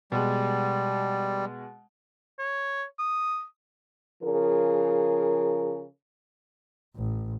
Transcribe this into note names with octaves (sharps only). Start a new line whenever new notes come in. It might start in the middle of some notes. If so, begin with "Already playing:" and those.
B2 G3 G#3
C#5
D#6
C#3 F3 G#4 A#4
A1